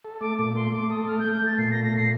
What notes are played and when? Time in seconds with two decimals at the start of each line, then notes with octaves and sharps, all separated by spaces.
0.05 A4
0.21 A3 D6
0.39 A#2 D6
0.55 A3 C6
0.72 A3 D6
0.90 A4 D#6
1.08 A3 F6
1.19 G6
1.24 A3
1.32 G6
1.42 A3 A6
1.58 A#2 C7
1.71 A#6
1.76 A3
1.84 A#6
1.93 A#2 C7